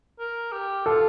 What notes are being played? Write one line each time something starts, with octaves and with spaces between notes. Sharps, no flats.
A#4
G4
F4 A4